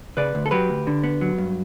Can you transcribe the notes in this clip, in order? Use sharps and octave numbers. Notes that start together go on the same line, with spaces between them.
C#3 B4 D5
D2
A4
F#3 G4 B4
D2
D3
B3
F#3
G2